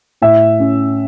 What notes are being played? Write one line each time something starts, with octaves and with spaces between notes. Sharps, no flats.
A2 E5
C#4